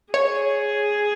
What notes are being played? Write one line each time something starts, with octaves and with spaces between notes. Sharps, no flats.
G#4 C#5